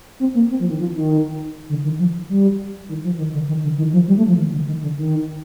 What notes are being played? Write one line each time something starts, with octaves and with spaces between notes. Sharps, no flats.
C4
A#3
C4
F3
D#3
F3
D#3
D3
D#3
F3
G3
D#3
F3
D#3
D3
D#3
D3
D#3
F3
G3
A3
F3
D#3
D3
D#3
D3
D#3